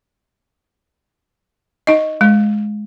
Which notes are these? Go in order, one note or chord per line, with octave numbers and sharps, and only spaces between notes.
D#4 D#5
G#3